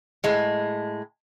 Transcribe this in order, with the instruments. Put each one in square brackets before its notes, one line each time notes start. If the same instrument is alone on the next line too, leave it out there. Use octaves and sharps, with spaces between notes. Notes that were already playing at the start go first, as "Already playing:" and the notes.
[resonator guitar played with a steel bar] A2 G#3